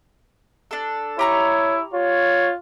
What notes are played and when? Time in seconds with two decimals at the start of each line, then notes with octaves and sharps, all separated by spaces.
0.71 D4 A4
1.19 E4 G4 C#5 A#5 C#6
1.94 F4 C#5